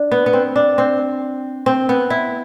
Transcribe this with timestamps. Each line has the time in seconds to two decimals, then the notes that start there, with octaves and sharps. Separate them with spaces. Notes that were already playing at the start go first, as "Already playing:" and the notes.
Already playing: D4
0.12 B3
0.26 B3
0.33 C4
0.56 D4
0.78 C4
1.66 C4
1.89 B3
2.10 E4